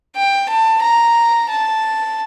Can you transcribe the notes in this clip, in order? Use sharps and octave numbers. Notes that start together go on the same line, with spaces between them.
G5
A5
A#5
A5